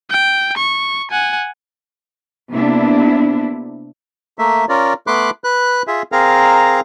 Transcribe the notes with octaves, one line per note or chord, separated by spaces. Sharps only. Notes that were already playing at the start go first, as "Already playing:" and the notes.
G5
C#6
F#5 G#5
C3 A#3 B3 D4 E4
A3 A#3 E5
C#4 F4 A#4 D5
A3 B3 B5 C6 D6 F#6
B4 F#6
F4 G#4 E5
C4 G#4 A#4 F5 A#5